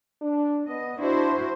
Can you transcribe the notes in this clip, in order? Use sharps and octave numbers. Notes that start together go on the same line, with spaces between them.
D4
B3 D#5
D4 E4 F#4 C5